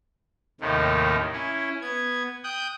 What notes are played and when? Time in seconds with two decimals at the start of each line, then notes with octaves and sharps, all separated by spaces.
0.61 D#2 A2 C3 D#3
1.32 C#4 E4
1.82 B3 G#6
2.44 G5 D#6 F#6 G6